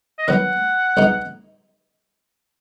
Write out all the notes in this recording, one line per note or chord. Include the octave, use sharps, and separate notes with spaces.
D#5
D#3 F#3 B3 F#5
B1 B2 G#3 D#4